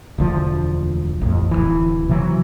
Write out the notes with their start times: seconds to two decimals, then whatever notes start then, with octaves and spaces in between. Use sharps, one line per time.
0.18 E1 D2 F3
1.21 A1 F2
1.51 D1 B1 E3
2.09 C3 E3 F#3